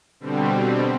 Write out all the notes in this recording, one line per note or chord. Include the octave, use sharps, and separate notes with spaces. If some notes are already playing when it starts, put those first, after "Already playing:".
B2 D3 G3 C4